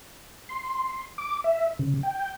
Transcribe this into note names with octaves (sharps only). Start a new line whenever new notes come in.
C6
D6
E5
C#3
G5